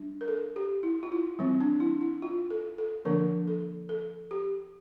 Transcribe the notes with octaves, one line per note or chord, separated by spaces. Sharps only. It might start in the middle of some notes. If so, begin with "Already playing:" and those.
Already playing: G3 D4
A#4
A4
G4
E4
F4
E4
E3 G3 C4
D4
E4
E4
F4
A4
A4
D3 F3 A#3 D4 A#4
A4
A4
G4